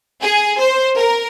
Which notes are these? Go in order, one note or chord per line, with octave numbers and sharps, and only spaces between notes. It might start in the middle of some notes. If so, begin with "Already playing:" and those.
G#4
C5
A#4